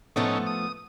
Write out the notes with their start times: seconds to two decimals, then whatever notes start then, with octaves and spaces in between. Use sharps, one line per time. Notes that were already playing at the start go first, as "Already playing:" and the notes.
0.16 A2 F3 A3 B3 C#4 D#4
0.47 D#6